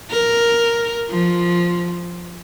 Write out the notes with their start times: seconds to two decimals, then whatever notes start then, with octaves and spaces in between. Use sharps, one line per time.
0.11 A#4
1.10 F3